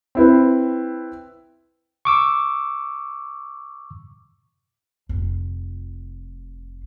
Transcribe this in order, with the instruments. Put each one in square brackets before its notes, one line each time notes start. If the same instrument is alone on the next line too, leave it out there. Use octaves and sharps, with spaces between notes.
[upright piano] C4 E4 B4
[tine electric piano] C#6 D6 E6
[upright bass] F1 F4